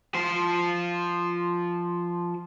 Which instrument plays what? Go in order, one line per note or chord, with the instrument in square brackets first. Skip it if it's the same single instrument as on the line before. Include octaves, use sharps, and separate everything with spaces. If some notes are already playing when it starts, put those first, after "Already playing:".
[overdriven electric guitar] F3 C5